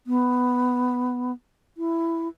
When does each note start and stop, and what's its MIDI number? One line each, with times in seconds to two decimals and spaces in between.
0.07 1.32 59
1.77 2.28 64